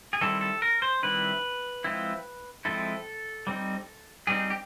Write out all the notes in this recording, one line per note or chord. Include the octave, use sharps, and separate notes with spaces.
G#4
D#3 G3 C4 E4 A4
A4
A#4
C5
D#3 G3 C4 E4 B4
F3 G#3 C4 E4
F3 G#3 C4 E4 A4
G3 C4 D#4
G3 C4 D#4 G#4
G4